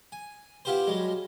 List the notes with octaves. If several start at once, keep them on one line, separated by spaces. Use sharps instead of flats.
G#5
B3 E4 F4 G4 B4 C5
F#2 G3 G#3